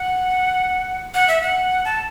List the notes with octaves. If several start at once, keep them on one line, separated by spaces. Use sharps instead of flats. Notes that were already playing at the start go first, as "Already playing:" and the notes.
Already playing: F#5
F#5
E5
F#5
A5